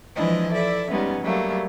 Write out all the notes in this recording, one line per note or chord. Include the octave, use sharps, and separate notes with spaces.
E3 F3 G#3 D4 E4 D#5
E4 A4 D5 E5
G3 G#3 B3 C#4 D#4
F#3 G3 A3 A#3